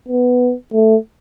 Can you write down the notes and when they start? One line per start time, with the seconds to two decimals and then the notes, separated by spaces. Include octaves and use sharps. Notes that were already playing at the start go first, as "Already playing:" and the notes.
0.09 B3
0.73 A3